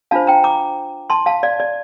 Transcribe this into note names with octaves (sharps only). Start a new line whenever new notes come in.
D4 F4 C5 F5 A5
G5 A#5
A#5 D6
A5 C6
F5 A5
D5 F5
D5